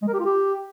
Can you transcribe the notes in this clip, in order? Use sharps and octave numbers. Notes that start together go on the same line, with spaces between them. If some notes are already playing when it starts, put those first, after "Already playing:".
G#3
A#4
G4
F4
G4